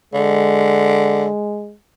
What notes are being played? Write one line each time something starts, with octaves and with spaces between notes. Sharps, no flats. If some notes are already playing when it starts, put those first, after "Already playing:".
D3 G#3